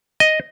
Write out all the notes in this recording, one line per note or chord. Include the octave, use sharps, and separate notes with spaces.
D#5